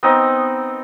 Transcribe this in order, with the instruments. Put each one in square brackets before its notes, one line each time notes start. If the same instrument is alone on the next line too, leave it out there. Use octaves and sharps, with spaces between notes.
[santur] B3 C4 D#4